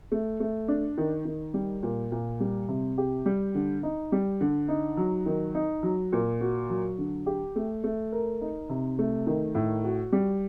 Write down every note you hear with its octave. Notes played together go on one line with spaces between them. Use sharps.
A3
A3
D4
D#3
D#3
G3
A#2
A#2
G3
C3
G4
G3
D3
D#4
G3
D3
D#4
F#3
D#3
D#4
F#3
A#2
F#4
F#3
D3
G4
A3
A3
A#4
D#4
C3
A3
D#3
A2
F#4
G3